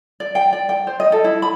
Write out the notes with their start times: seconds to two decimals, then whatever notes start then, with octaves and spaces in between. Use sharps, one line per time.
0.20 D5
0.35 G5
0.53 D5
0.69 G5
0.87 C5
1.00 D#5
1.12 A4
1.24 E4
1.42 B5